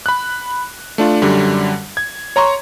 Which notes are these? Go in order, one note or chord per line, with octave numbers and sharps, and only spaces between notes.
B5 F#6
A3 D4 F4
F#2 D3 G3
G#6
C#5 A#5 C6 C#6